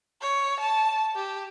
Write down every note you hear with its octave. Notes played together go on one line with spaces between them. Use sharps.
C#5
A5
G4